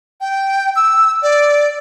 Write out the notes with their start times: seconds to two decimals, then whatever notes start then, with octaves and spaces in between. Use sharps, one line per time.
0.21 G5
0.76 E6
1.23 D5